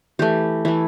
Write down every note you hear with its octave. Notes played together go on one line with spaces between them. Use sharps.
E3 A3 G4
E3 A3 E4